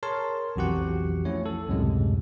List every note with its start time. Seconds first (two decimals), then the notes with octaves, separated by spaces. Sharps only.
0.03 G#4 A#4 C#5 A5 C6
0.56 B1 F2 E3 F#4 G4 F#5
1.25 F3 A3 C#4 E4 C#5
1.46 A4
1.68 C#2 F#2 A2 C3 G#3